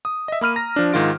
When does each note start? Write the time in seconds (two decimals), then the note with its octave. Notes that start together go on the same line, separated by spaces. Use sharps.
0.05 D#6
0.28 D#5 E5
0.41 A#3 B5 F6 D#7
0.56 A#5 A#6
0.76 F3 D4
0.93 G#2 D#3 F4 D7